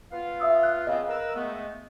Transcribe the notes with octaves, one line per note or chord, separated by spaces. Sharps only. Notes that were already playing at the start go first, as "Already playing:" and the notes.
B3 F4 F5
E5 D#6 E6
F#6
C#3 B3 C4 D#5 F5
A#4 B4 E6
G#3 A3 B3